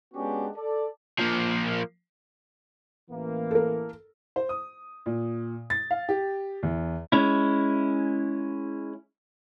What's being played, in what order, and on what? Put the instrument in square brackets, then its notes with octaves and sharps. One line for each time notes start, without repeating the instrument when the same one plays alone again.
[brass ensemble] G#3 B3 C#4 D4 F#4 G4
A4 D5
[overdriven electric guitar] F3 A#3
[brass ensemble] A1 E3 A#3
[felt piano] A4 A#4
[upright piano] C5
D#6
A#2
A6
F5
G4
E2
[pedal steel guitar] G#3 C#4 E4